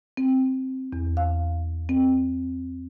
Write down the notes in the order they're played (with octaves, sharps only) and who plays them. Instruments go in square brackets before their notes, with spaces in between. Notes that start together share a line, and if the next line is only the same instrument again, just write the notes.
[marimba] C4
E2
F5
C4